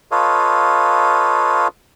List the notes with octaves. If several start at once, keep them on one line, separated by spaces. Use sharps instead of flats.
F4 A4 B4 C#5 D#5 F5